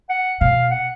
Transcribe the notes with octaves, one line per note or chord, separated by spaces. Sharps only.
F#5
B2 F5
F#5